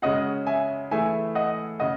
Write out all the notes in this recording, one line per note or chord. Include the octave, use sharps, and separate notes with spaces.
C#3 G#3 C#4 F#4 D#5 F#5
E5 G#5
E3 A3 E4 G#4 E5 G#5
D#5 F#5
C#3 D#5 F#5